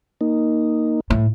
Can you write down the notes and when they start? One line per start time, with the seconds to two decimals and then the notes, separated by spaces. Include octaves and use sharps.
0.21 A#3 D#4
1.10 A2